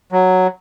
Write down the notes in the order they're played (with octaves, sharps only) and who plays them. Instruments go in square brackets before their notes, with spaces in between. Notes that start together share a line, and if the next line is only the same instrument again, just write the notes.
[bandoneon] F#3